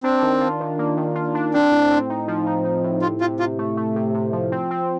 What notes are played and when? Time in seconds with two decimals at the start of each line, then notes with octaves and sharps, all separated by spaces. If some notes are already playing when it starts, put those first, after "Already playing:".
0.03 C4 D4
0.22 D#3
0.41 F4
0.60 D#3
0.79 A#3
0.97 D#3
1.15 F4
1.35 D4
1.54 C4 D4
1.72 A2
1.91 C4
2.10 D#4
2.28 F3
2.46 D#4
2.65 D#4
2.84 A2
3.02 C3 F4
3.21 C3 F4
3.39 C3 F4
3.59 A3
3.77 A3
3.96 C3
4.14 C3
4.33 F3
4.52 C4
4.71 C4